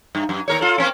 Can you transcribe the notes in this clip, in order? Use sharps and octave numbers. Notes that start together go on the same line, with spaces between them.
G2
F#2
D#2 A#4 C#5
F4 A4
A#3 C4 C#4